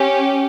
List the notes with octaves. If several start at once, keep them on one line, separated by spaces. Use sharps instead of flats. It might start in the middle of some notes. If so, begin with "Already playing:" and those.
Already playing: C#4 G4